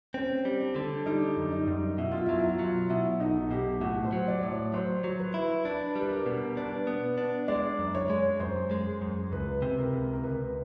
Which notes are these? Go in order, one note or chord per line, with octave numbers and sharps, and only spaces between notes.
C4 C#4
G3
D4
D3
G3 D#4
F#2
D#4
F#2
B2 E4
F4
F#3 E4
E4
F4
F#3
B2 E4
B1 D#4
B2 G4
A2 F#4
C5
F#3
D5
A2
C#5
F#3 C5
F#3
B4
E4
D4 B4
G3
B4
A#4
B2
D4 B4
B3
D4
G#3 D5
F#2
C#5
G#3
F#2 C5
G#3
F#2
C#2 B4
C3
A#4
C#2
A#4
C#2 B4